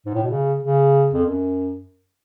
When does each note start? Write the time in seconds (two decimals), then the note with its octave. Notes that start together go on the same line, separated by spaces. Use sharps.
0.06 G#2
0.14 A2
0.23 B2
0.31 C#3
0.63 C#3
1.14 F2
1.25 F#2